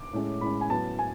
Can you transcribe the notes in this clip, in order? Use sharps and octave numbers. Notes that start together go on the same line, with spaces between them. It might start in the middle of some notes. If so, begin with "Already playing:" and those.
Already playing: D6
A2 G#3 C#4
A2 G#3 C#4 B5
G#5
A2 F#3 B3 A5
G#5